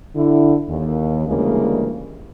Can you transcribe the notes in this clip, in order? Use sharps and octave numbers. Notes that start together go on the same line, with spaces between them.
D3 E4
D#2
D2 C#3 E3 G3 G#3 A#3